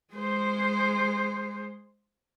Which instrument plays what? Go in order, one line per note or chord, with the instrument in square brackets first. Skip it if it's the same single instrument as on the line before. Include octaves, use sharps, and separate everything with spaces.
[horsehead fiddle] G#3 C5